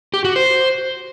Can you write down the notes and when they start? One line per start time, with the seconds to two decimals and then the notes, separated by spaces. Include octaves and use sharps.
0.14 G4
0.25 F#4
0.36 C5